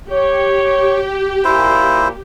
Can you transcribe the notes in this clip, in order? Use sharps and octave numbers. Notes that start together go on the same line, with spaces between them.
G4 C#5
A#2 E4 C5